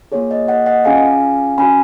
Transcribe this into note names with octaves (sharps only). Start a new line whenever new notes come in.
A#3 F4 G#4 C#5
D#5
D#5 F#5
D#5 F#5
C#4 F4 G#4 F5 G#5
C#4 F#4 G#5 B5